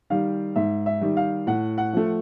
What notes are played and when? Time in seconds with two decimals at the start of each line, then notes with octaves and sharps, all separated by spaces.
0.10 D#3 G3 F5
0.56 G#2 E5
0.86 E5
1.01 D#3 G3
1.17 F5
1.47 A2 F#5
1.78 F#5
1.93 F3 A3